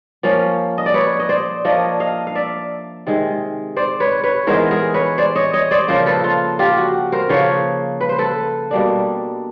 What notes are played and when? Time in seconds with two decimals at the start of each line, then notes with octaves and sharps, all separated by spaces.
0.23 F3 A#3 C#4
0.78 D#5
0.86 D5
0.94 B4 C#5
1.20 D#5
1.29 C5 D5
1.65 F3 A#3 D4 C#5 D#5
2.00 D#5 F5
2.27 F5
2.35 D5 E5
3.07 C3 D#3 G#3
3.77 C5 D5
4.00 B4 C#5
4.23 B4 C#5
4.47 E3 G#3 B3 D#4 A#4 C5
4.71 G#4 A#4
4.94 B4 C#5
5.18 C5 D5
5.36 C#5 D#5
5.53 C#5 D#5
5.71 C5 D5
5.88 C#3 F3 A#3 A#4 C5
6.06 A4 B4
6.24 F4
6.59 F4 G4
6.77 F#4
7.12 A#4 C5
7.29 C#3 F3 A#3 B4 C#5
8.01 B4
8.09 C5
8.18 A4 B4
8.71 B2 G3 A#3 D4